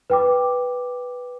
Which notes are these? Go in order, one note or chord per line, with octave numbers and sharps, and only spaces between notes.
B4 G5 D6